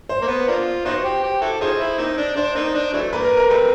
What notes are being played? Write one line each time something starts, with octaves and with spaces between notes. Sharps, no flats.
C5
A#3
B3
A#3 D4 F4
B3 D#4 F#4 C5
G4
G4
E4 F#4 A4
D#4 F4 G#4 C5
E4
A#3 C4 D#4
D4
D4 C5
A#3 C4 D#4
D4
E3 F#3 A3
A#3 B4
A#4
A#4
G3 A3 C4 B4